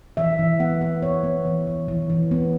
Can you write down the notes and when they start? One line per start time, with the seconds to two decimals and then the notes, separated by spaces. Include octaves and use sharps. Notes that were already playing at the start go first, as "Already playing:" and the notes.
0.17 E3 E5
0.39 E3
0.60 B3 F#5
0.81 B3 F#5
1.02 B3 C#5
1.24 B3
1.45 E3
1.67 E3
1.88 E3
2.10 E3
2.31 B3